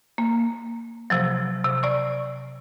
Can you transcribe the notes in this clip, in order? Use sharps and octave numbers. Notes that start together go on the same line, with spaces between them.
A#3
C3 F3 F#3
C3
D5 C#6